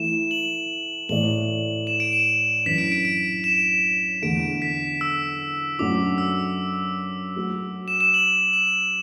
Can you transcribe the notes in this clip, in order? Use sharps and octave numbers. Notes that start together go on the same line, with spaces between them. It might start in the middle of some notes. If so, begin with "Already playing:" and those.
Already playing: E3 A3 E4 A4 E7
F#7
A2 E3 A3 E4 D5 F#7
E7
D7
E7
F#2 E3 D4 B4 B6
D7
D7
D7
E7
E2 D3 A3 D7
B6
E6
F#2 F#3 A3 D4 F#4 D6
E6
F#3 A3 F#4
E7
E7
F#7
E7